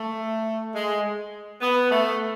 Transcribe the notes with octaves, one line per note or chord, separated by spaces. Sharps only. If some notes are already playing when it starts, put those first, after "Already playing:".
Already playing: A3
G#3
B3
A3